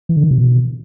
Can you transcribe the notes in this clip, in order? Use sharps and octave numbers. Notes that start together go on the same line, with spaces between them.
E3
D3
D#3
C3
B2